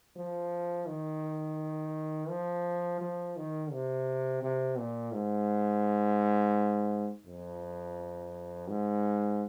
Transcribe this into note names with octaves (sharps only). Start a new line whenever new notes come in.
F3
D#3
F3
F3
D#3
C3
C3
A#2
G#2
F2
G#2